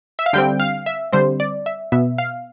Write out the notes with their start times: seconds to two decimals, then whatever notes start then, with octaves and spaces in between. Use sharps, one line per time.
0.19 E5
0.26 F5
0.33 D3 G3 C4 G5
0.60 F5
0.86 E5
1.12 D3 G3 C4 C5
1.40 D5
1.66 E5
1.92 B2 B3 E5
2.18 F5